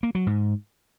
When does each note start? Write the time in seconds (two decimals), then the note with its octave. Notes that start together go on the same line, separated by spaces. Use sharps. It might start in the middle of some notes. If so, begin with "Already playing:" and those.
0.03 A#3
0.15 F#3
0.27 G#2